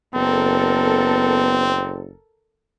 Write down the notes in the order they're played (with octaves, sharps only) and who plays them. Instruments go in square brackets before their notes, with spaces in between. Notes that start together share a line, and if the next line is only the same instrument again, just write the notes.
[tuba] F#1 [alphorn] B3 [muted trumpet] C4 [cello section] A4 A#4